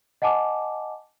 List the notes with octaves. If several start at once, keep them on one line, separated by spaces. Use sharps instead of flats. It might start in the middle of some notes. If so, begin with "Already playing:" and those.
D#5 F#5 G#5 A5 D6